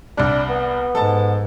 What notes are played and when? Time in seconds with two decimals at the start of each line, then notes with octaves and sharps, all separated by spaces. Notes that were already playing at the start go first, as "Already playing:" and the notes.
0.17 C2 G3 D4
0.49 B3
0.95 G#2 A4 A5